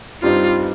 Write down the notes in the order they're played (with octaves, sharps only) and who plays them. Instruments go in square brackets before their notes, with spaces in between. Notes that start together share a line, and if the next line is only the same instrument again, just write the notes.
[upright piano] G2 G3 C4 D#4 [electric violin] F4